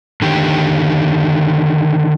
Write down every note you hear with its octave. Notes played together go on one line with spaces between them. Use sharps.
D3 D#3 G4